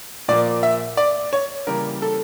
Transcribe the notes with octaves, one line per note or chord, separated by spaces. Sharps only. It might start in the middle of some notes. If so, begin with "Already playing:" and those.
A#2 F3 A#3 D5
E5
D5
C#5
C#3 E3 G3 A#3 A#4
A4